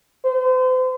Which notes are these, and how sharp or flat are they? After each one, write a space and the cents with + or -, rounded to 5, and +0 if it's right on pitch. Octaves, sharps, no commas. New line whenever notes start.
C5 -40